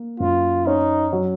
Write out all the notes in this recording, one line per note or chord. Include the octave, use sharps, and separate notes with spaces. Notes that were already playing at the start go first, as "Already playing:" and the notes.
Already playing: A#3
F#2 F4
C#4 D#4
F#3